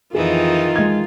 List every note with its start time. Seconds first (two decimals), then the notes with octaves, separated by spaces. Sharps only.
0.15 F2 D#3 E3 D#4 F4 G#4
0.76 G#3 G#6